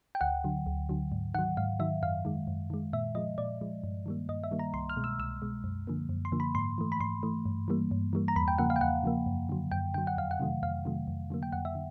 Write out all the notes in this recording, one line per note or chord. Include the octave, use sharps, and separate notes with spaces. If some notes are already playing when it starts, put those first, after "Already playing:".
G5
D2 F#5
D3 F#3
D2
D3 F#3
G#2
D#3 F#3 F#5
G#2 F5
D#3 F#3 E5
F#2 F5
D#3 G#3
F#2
D#3 G#3
A#2 E5
F3 G#3 D#5
A#2 D5
F3 G#3
G2
D#3 G3 A#3
G2 D#5
E5
D#3 G3 A#3
A#5
C2 C6
F6
B2 G#3
E6
C2 E6
B2 G#3
F#2
D3 F3 A#3
F#2
C6
D3 F3 A#3
B5
G#2 C6
E3 A3
B5
G#2 C6
E3 A3
G2
E3 G3 A#3
G2
E3 G3 A#3
A#5
E2 B5
G5
C#3 F3 A#3 F#5
F5
G5
E2 F#5
C#3 F3 A#3
F#2
D3 F#3
F#2 G5
D3 F#3 G5
F#5
F2 F5
F#5
C3 D#3 F#3 A3
F2 F5
C3 D#3 F#3 A3
F2
D3 F#3 A#3
G5
F2 F#5
E5
D3